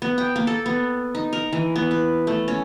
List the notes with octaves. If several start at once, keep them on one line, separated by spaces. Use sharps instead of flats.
B3
G5
A#3
A4
B3
D#4
A#4
E3
B3
B4
A3
C#4